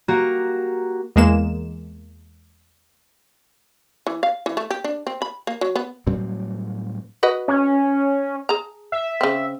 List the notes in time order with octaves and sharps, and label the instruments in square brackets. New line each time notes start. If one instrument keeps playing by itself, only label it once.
[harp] A#3 F#4 G4 A#5
[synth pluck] E2 G#3 A#3 E7
[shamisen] E3
F5
E3
A3
G4
D4
C4
B5
A#3
F#3
B3
[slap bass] A2 F#3 G3 C4
[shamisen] F#4 B4 D#5
[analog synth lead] C#4
[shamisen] G#4 A#5
[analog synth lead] E5
[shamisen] C#3 C4